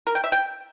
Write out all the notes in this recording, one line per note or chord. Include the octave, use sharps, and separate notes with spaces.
A#4
G5
E5
G5